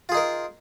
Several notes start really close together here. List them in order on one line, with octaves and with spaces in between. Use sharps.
F4 G#4 D#4 A#4